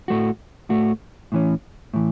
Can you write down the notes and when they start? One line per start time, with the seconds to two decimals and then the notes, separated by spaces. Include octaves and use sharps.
0.08 A2 A3 F#4
0.69 A2 A3 F#4
1.32 A2 E3 C#4
1.94 A2 E3